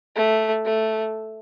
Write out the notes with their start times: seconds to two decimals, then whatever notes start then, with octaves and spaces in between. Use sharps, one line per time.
0.16 A3
0.65 A3